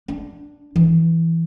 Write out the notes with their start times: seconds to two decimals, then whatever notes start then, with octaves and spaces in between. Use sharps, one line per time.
0.08 D4
0.76 E3